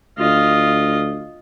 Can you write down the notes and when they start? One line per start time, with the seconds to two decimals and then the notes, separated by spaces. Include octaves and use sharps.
0.19 D2 F4 D#5